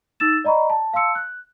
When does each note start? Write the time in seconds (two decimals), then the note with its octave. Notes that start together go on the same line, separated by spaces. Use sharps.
0.20 D#4 E6 A6 E7
0.44 D5 D#5 A#5 B5 C#6
0.70 A5
0.94 F5 A5 C6 E6 C#7
1.15 F#6